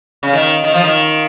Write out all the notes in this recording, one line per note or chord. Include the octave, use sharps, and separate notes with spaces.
C#3
D#3
D#3
F3
D#3